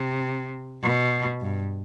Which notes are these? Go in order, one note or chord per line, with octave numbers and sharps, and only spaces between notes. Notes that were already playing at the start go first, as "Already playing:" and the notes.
Already playing: C3
B2
G2